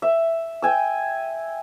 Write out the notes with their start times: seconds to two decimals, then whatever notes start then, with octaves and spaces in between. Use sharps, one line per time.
0.02 E5
0.62 G5 G#5 E6